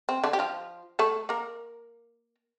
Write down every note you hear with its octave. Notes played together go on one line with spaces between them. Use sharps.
C4
D3 D4
G4
F3 F4
A3 A4
A#3 A#4